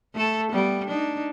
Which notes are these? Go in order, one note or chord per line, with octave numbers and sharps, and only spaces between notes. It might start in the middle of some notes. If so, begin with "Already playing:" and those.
A3 A4
G3 B3
D4 D#4